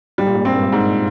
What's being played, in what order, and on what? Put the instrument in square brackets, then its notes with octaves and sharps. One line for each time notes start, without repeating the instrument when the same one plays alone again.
[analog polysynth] G#2 [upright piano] G3
[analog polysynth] A#2
G#2
[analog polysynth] G2 [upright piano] C4
[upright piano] G#2